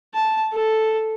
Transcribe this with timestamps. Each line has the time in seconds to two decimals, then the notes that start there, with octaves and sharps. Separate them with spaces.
0.15 A5
0.53 A4